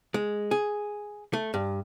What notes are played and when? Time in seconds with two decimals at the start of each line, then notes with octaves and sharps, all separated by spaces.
0.14 G#3
0.51 G#4
1.33 A3
1.54 G2